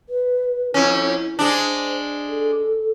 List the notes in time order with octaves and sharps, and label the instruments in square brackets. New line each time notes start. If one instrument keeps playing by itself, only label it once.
[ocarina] B4
[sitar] F2 C#4 [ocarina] E4
[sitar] G#3 D4 [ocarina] C5
[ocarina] A4